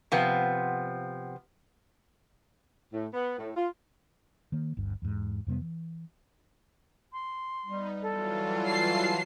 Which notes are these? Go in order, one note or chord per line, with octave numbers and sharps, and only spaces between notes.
C3 F3 B3
A2
B3
A2
F4
D#3 A#3
G1 D2 G2
E2 G#2
F2 C3 G3 B3
E3
C6
G3 B3 D#4
E3 F#3 F4 A4
A5 C7